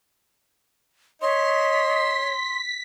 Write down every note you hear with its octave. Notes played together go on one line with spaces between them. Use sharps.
C#5 D#5 C6 B6